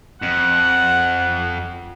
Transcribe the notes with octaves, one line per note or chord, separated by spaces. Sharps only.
F2 F#5